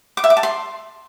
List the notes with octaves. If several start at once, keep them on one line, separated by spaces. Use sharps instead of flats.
D6
E5
D6
A5
C6